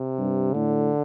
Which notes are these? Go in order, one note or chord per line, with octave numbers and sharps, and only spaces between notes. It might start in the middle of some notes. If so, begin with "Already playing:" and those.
Already playing: C3
G2
A2 D3